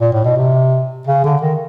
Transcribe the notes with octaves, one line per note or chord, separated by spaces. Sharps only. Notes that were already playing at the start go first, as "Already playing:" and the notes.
A#2
A2
B2
C3
C#3
D3
D#3